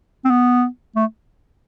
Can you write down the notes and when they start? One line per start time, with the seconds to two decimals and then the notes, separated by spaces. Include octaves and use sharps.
0.25 C4
0.30 B3
0.96 A3